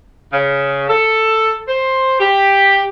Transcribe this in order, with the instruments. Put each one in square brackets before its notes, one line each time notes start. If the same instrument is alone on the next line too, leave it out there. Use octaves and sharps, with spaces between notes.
[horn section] C#3
A4
C5
G4